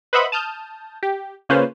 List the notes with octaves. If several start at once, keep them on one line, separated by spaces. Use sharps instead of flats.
B4 C5 D#5 E5 F#5 B5
A5 D#6 F6 G6
G4
C#3 A#3 C#4 F4 B4 C5